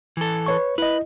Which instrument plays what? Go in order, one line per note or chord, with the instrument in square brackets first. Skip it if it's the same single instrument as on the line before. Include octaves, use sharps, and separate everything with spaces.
[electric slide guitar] E3 A4
[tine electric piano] B4 C#5 C#6
[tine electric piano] E4 D#5 [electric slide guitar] B4